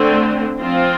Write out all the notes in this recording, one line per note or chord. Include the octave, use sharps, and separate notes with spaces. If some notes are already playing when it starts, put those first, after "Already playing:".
Already playing: D3 A3 C4
F3 C4 F4